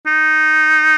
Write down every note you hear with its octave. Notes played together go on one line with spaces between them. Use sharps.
D#4